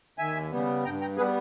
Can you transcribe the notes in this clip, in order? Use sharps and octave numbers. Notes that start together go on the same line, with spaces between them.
D#2 E5 G#5
C#3 G3 B3
G2 G5 A#5
G5 A#5
G3 B3 G#4 B4